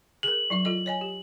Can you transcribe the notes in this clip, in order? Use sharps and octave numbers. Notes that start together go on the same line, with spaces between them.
G#4 A#4 F#7
F#3 E4 E5
F4 A4 D#5
C#5 D#5 G#5
G4